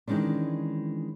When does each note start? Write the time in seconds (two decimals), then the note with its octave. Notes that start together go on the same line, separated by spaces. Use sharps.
0.08 D#3 E3 G#3 C#4 D4